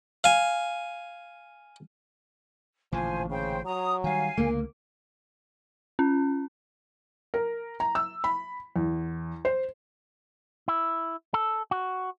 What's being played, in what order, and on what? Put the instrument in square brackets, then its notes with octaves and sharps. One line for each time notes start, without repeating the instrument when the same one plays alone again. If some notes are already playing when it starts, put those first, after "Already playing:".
[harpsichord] F5 G#5
[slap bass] A1 A#2 D3 [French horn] F3 [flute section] C5 G#5
[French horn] C#3 [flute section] C5 G5
[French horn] F#3 [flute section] A#5 D#6
[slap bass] D#3 G3 [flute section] F5 G#5
[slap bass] C#2 D3 [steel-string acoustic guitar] A#3
[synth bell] C#4
[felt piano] A#4
A#5
E6
B5
E2
C5
[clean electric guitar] E4
A4
F#4